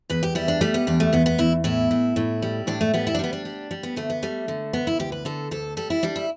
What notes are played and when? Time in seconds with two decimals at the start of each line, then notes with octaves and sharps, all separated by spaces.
0.10 E2 B4
0.23 G4
0.35 G3 E4
0.48 D4
0.61 G3 A3
0.74 B3
0.87 E2 D4
1.00 A3
1.13 E2 B3
1.26 B3
1.38 E2 E4
1.64 A2 E4
1.91 A2
2.16 A2
2.42 G3
2.67 A2 D4
2.81 A3
2.94 G3 B3
3.07 E4
3.15 D4
3.19 G3 B3
3.33 D4
3.45 G3
3.71 G3
3.83 B3
3.96 D2 A3
4.10 B3
4.23 G3 A3
4.48 D3
4.73 D2 B3
4.87 E4
4.99 D2 G4
5.12 B4
5.25 D3 A4
5.51 D2 A4
5.77 G3 A4
5.90 E4
6.03 G3 D4
6.16 E4